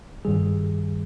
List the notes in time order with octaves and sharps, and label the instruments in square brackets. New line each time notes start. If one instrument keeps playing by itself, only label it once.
[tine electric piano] G2 D#3 G3 G#4